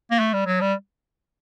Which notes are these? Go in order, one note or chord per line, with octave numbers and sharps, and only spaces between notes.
A#3
A3
G3
F#3
G3